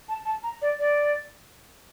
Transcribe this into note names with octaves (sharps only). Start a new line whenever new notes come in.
A5
A5
A#5
D5
D5